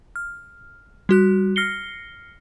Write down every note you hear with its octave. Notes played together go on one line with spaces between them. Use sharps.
F6
G3 F#4 F#6
F6 A#6 C7 C#7 G7